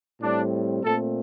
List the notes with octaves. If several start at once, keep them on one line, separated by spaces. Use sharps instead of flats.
A2 G3 C4 D4
A#2 A3 C4 A4